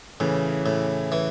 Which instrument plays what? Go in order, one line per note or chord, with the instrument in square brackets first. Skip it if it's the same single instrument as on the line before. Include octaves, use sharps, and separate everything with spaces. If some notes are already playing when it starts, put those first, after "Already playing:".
[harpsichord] A2 [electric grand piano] C#3 E3
[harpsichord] A2
E3